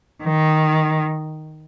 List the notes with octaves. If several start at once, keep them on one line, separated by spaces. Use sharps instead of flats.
D#3